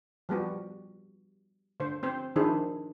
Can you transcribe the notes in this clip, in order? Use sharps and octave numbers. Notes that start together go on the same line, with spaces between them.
F3 G3 B3 F#4
D3 C5
C4 C5
D#3 F3 D4 E4 G#4 C5